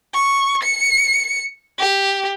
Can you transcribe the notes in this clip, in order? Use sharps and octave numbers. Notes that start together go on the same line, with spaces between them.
C#6
C#7
G4